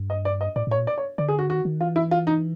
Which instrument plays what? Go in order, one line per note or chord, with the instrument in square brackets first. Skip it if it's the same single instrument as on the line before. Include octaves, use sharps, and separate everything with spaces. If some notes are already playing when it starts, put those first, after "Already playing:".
Already playing: [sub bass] G2
[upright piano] D#5
D5
D#5
[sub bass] A2 [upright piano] D5
[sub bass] A2
[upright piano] C#5
[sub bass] A#2
[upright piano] D5
C#5
[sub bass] D3 [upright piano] D5
[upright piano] G#4
F#4
[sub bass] D#3 [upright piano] F#4
[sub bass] D#3
[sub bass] E3 [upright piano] F4
[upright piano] E4
F4
D#4